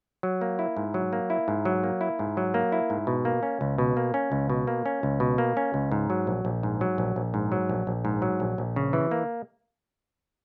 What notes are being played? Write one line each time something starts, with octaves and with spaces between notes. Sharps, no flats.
F#3
A#3
E4
G#2
F#3
A#3
E4
G#2
F#3
A#3
E4
G#2
F#3
A#3
E4
G#2
B2
A#3
C#4
C#2
B2
A#3
C#4
C#2
B2
A#3
C#4
C#2
B2
A#3
C#4
C#2
G#2
F#3
A#1
A#1
G#2
F#3
A#1
A#1
G#2
F#3
A#1
A#1
G#2
F#3
A#1
A#1
C#3
E3
A#3